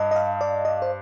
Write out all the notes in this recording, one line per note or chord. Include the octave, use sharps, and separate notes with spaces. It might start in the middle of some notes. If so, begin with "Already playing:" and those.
Already playing: G2 D#5
D#5
F5
D5
D#5
C5